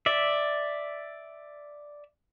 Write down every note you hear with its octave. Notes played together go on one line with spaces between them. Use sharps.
D5 E5